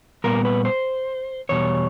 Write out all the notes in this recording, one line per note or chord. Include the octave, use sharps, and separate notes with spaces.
A#2 G3 B3 A#4
B4
C5
E2 B2 G3 C#5